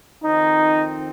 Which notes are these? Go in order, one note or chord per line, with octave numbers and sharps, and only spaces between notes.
F2 D#3 C4 D#4